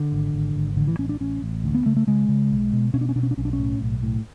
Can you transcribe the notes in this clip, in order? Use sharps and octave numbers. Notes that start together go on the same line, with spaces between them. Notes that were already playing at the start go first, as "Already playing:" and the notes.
Already playing: D3
G#1
G#1
G#1
A1 D3
E3
A1 C#4
D4
A1 C#4
A1
D2
B3
C#3 A3
A3
C#3 G#3
C#3
B1
B2
B2 C#4
D4
C#4
B2 D4
C#4
D4
B1 C#4
D4
C#4
A2
B1
A2